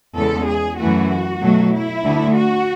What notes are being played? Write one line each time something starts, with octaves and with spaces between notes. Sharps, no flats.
E2 C#3 G#3 A4
G#4
F#2 E3 A3 F#4
B2 F#3 A3
E4
D2 D3 A3
F#4